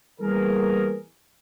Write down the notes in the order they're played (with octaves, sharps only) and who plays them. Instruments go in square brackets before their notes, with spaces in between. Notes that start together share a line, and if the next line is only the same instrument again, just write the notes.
[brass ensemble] E3 G3 A#3 B3 G#4 A#4